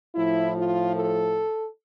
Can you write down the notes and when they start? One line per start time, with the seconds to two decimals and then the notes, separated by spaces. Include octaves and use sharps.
0.16 A2 F3 E4
0.57 F4
0.96 A4